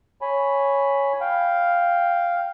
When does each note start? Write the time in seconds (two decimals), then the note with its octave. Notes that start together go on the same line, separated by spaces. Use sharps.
0.21 C#5 G#5 B5
1.21 F5 G5